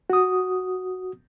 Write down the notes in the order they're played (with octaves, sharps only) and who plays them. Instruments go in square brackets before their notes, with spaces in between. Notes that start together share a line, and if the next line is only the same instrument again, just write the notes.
[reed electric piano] F#4 D#6